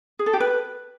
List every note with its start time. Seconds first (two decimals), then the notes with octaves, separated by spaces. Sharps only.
0.19 G#4
0.26 A4
0.33 G4
0.40 B4